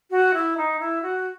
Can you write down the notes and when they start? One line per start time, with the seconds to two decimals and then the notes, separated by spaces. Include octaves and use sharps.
0.10 F#4
0.33 E4
0.57 D#4
0.79 E4
1.02 F#4